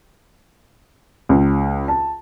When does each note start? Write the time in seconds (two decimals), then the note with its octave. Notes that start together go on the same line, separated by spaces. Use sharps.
1.29 C#2
1.88 A5